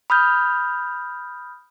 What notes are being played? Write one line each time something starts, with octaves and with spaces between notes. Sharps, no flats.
B5 D#6 F6 G6